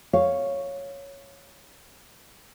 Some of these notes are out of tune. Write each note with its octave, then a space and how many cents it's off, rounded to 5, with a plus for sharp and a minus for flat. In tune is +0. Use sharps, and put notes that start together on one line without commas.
C#5 +0 F5 +0